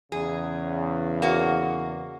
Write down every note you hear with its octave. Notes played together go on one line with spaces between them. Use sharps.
E2 C#3 G#4
A#3 F#4